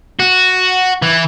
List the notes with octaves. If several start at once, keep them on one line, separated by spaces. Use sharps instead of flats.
F#4
E3